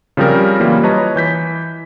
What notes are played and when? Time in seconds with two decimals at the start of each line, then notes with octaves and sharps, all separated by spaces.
0.17 C#3 F3 G3 C4 A#4
0.60 E3 F#3 G3 A#3 F4
0.83 B4 C#5 D#5 A5 A#5
1.16 E3 G6 B6